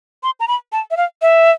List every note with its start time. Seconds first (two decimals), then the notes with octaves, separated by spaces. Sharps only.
0.23 C6
0.40 A#5
0.48 B5
0.72 A5
0.91 E5
0.97 F5
1.22 E5